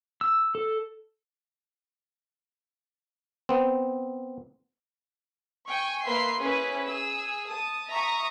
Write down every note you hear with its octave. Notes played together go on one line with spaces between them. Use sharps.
E6
A4
B3 C4
G5 G#5 C#6
A#3 B4 E5 C6 C7
C#4 E4 G#4 B4
G#4 E6
A5 D#6
E5 A#5 C#6 D#6